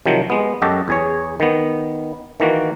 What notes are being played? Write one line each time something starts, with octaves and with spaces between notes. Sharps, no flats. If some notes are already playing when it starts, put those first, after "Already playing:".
C3 D#3 F3 F#3
G#3 B3
F#2 F#4 G4 A4 D#5
E2 G#4 C#5
D#3 B3
D#3 E3 A#3 F#4